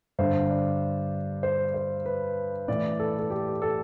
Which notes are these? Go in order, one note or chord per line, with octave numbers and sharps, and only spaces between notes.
G2 D3 C5
D5
C5
C5
B4
A2 E3 D5
A4
A4
G4
A4